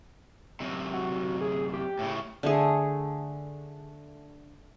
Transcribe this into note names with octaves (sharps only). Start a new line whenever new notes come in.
F#2 C3
F#4
G#4
G4
A2 C#3
D3 A3 G#4